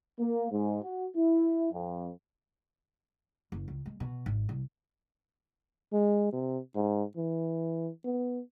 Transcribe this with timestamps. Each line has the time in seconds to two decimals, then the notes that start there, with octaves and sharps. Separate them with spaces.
0.19 A#3
0.52 G#2
0.83 F#4
1.16 E4
1.72 F2
3.52 F#1
3.68 C#2
3.86 G#3
4.00 B2
4.26 G#1
4.49 C2
5.92 G#3
6.32 C3
6.75 G#2
7.16 E3
8.04 B3